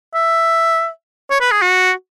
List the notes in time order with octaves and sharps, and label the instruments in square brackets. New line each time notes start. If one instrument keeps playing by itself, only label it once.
[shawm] E5
C#5
B4
G#4
F#4